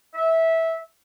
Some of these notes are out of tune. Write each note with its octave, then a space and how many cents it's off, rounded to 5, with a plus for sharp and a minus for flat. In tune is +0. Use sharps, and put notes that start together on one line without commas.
E5 -15